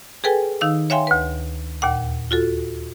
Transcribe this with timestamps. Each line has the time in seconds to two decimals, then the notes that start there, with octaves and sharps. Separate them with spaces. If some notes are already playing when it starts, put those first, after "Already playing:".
0.24 G#4 A4 B4 G5 G#5
0.61 D#3 D#4 F5 E6
0.90 C#5 E5 F5 G5 G#5 C6
1.07 D2 B4
1.82 D#2 A#2 F#5
2.31 F4 F#4 A4